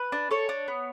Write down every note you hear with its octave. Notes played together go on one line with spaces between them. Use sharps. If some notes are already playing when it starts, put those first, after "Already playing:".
Already playing: B4
D4
A4 C#5
D4
B3